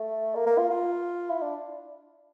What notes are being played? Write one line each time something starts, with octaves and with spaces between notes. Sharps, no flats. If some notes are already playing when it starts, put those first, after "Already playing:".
Already playing: A3
A#3
A#3
F4
F4
E4
D4